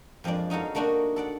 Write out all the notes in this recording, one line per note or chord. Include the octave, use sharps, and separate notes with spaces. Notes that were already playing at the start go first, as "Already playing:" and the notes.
F2 F3 G#3 D4 D5
C#4 D#4 F#4 A4 F5
A3 A#3 D4 D#4 F#4 A#4
A4 D5 F#5